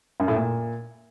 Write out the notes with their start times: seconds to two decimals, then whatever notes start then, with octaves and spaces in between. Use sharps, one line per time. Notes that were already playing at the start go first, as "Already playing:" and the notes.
0.20 F#2
0.28 A2
0.36 A#2